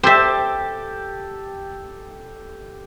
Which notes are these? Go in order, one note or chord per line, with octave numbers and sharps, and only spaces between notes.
G4 A4 C5 E5 A5